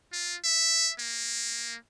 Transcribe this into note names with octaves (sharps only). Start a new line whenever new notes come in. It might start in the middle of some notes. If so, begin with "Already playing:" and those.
F4
E5
A#3